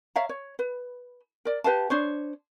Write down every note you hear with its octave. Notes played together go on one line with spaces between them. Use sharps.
C#5 E5 F5 A#5
C#5
B4
A#4 D5
G4 B4 F5 A5
D4 C5 C#5